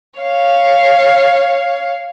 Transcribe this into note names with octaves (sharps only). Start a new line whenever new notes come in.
C#5 F5